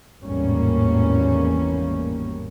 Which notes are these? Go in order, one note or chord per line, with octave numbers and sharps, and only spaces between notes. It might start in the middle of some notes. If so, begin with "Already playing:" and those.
G#1 E2 A2 G3 A#3 C#4